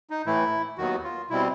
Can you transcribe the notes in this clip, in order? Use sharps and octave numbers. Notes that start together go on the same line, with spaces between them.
D#4
A2 E3 A3 E4
D#2 D#3 F#3 B3 F#4
F4
B2 G3 C4 E4